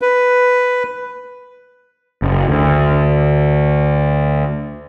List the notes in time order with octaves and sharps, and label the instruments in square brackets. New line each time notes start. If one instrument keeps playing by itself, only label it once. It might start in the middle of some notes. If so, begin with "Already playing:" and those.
[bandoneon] B4
[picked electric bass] F#1
D2